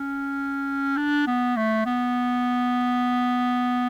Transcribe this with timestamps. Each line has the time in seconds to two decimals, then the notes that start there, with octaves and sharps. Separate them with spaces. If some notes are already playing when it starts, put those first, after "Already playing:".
Already playing: C#4
0.97 D4
1.27 B3
1.57 A3
1.86 B3